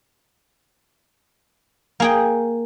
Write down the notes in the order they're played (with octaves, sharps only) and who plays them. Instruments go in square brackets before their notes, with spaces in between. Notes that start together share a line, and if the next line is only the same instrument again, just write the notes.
[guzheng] A#3 G#4 G5